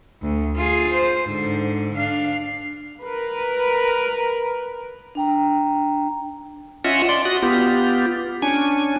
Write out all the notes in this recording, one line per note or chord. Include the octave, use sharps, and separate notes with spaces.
D2
F4 G#4
C5
G#2 D3
D4 F5
A#4 B4
D4 G5 A#5
C#4 F4 D#5 E5 F#5
D5 C6
F#4 D#6 F#6
B3 F4 G4
C#4 D4 G#5